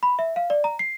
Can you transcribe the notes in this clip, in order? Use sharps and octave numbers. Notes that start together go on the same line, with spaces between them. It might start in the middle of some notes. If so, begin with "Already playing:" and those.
B5
E5
F5
D5
A#5
C7